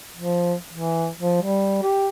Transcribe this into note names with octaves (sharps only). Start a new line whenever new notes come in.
F3
E3
F3
G3
G4